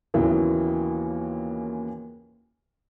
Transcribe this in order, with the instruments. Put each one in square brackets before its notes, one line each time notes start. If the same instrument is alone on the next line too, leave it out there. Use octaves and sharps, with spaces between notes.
[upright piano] D#2 A#2 C#3 E3 F#3 B3